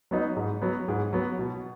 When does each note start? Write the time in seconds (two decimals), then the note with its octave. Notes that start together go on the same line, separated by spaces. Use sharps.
0.11 F#3 B3 D#4
0.36 G#2
0.62 F#3 B3
0.88 G#2
1.13 F#3 B3
1.39 B2